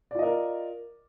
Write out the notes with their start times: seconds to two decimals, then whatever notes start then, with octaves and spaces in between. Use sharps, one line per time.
0.11 D5
0.15 F4
0.19 D#5
0.23 A#4